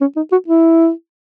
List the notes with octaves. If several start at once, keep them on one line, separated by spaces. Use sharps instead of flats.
C#4
D#4
F#4
E4